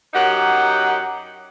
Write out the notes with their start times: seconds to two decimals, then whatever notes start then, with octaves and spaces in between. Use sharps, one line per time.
0.13 F#2 D#4 G4 F#5